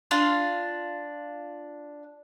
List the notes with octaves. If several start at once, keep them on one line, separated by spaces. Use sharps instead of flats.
D4 F4 F5 C6